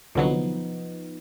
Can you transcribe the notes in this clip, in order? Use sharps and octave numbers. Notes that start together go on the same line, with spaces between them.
C2 D3 F3 F#3 B3 D#4